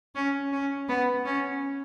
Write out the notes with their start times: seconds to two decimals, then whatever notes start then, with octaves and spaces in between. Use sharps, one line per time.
0.15 C#4
0.53 C#4
0.89 B3
1.25 C#4